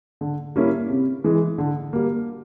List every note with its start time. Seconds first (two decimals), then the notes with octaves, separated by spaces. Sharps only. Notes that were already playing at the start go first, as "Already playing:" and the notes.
0.21 D3
0.56 G3 A#3 C#4 E4
0.90 C3
1.24 E3 G#3
1.58 D3
1.93 G3 A#3